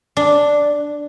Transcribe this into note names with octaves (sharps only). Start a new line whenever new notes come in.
D4